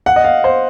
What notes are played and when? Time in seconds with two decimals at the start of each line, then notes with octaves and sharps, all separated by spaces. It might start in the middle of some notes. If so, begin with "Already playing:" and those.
0.06 F#5
0.16 D#5
0.24 F5
0.44 C5